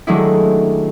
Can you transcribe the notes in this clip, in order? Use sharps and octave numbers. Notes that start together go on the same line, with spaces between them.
D#3 F#3 G#3 A3 D4 E4